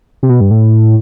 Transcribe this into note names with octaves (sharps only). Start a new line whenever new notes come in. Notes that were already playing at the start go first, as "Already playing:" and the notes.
C3
B2
G2
A2